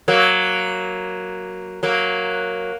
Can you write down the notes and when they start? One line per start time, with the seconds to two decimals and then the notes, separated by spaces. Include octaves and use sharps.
0.08 F#3 A#3
1.83 F#3 A#3